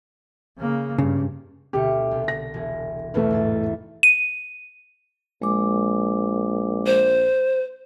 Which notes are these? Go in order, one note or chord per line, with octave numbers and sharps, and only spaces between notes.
C#3 A#3
G2 C#3
D2 B2 G4 C#7
C2
A#6
E1 G#4
E1 B1 E2 A3 B4
A1 G#2 A6
D#7
A#1 G#3 D6
C5